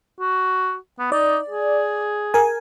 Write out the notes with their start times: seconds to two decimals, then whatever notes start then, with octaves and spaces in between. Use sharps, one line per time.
0.20 F#4
0.99 B3
1.12 D#4 D5
1.50 G#4
2.34 A#4 G#5